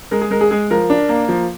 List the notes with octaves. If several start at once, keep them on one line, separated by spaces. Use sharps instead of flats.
G#3 A#4
G#4
G#3 A#4
G#4
G#3 G#4
F3 A#4
D4
A#3
F3